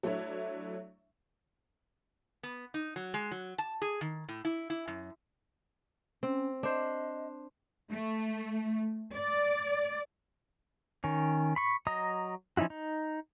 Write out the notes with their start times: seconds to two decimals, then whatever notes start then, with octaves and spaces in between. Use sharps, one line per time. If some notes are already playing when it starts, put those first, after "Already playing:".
0.03 F#3 A3 D4 E4 C#5 E5
2.43 B3
2.74 D#4
2.96 F#3
3.14 G#3
3.31 F#3
3.58 A5
3.82 G#4
4.01 D#3
4.28 A2
4.45 E4
4.70 E4
4.88 F#2
6.23 C4 C#4
6.63 D4 C5 D#5
7.90 A3
9.14 D5
11.04 D#3 C#4
11.56 B5 C#6
11.87 F#3 D#5 A#5 D#6
12.57 F3 C#4 D#4 E4 F#4
12.70 D#4